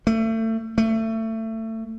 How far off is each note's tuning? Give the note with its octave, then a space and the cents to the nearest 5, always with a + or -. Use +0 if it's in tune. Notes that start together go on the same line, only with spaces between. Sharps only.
A3 +30
A3 +25